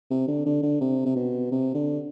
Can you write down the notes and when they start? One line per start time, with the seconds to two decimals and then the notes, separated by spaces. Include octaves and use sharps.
0.10 C3
0.28 D3
0.46 D3
0.63 D3
0.81 C3
1.06 C3
1.16 B2
1.51 C3
1.74 D3